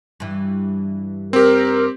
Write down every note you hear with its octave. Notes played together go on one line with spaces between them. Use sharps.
G2 E3
C4 G4 A#4